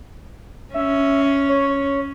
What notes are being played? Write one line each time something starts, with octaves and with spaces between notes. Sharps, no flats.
C#4 E5
C#5